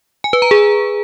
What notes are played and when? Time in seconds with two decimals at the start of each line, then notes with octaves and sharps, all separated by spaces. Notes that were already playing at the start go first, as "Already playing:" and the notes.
0.24 G#5
0.33 B4
0.42 A#5
0.51 G#4